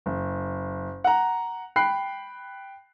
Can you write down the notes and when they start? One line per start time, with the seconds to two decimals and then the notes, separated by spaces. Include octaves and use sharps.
0.06 F#1
1.04 F#5 A#5
1.76 G5 B5 F#6 C7